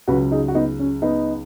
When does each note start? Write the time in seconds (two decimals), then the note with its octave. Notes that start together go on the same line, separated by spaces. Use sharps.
0.08 C#2 C#3 F#3 F#4 B4
0.31 D#4 G#4
0.48 F#4
0.55 B3 D#4
0.79 C#4
1.02 B3 D#4